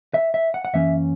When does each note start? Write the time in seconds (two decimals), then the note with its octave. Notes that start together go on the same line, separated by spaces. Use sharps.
0.14 E5
0.34 E5
0.54 F#5
0.65 F#5
0.73 F#2 E3 A#3 C#4 E5